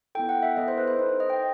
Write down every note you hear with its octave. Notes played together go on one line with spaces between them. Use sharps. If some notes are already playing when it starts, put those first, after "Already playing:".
B3 E4 A4 G5
F#5
E5
B3 E4 A4 D#5
C5
B4
C5
D#4 A4 C5
C5
D#5
G5